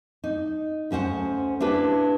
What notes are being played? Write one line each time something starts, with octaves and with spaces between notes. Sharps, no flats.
D#4
D2 C#4 C5 F#5
D4 E4 G4 B4